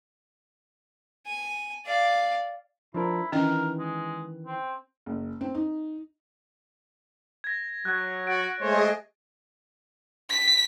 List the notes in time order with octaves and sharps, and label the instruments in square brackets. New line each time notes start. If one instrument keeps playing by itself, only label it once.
[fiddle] G#5
D5 F5
[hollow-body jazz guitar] F3 D4 A#4 [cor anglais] E4
[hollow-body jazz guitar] D#3 E3 [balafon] C#4 D4 D#5 [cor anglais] A#4
[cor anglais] G#3
C4
[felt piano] F#1
C4
D#4
[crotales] G#6 A#6
[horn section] F#3 [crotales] F#6 G#6
[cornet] F#4 [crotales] F#6 A6 D7
[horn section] G#3 A3 C5 [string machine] G#4 D#5 [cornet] C#5
[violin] B6